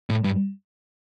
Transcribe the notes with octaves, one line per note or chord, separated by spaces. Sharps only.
A2
G2